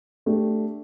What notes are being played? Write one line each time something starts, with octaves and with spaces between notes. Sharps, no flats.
A3 D4 G4